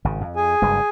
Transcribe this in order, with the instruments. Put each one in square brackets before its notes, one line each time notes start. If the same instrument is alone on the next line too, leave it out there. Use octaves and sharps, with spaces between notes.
[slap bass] G#1 C#3
F2
[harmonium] G#4 G#5
[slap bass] F#1 G2 G#3